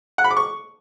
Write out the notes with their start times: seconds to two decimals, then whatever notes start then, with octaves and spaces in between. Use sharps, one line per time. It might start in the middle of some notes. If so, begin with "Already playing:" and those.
0.18 F#5
0.24 B5
0.31 D6
0.37 C#6